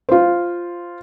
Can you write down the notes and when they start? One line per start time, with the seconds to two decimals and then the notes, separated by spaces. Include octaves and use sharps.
0.09 F4 C5